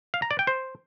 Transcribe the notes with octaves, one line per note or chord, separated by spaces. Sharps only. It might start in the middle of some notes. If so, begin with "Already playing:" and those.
F5
A#5
D5
G5
C5